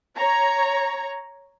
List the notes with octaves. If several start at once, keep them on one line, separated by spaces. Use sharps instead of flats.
C#5 A#5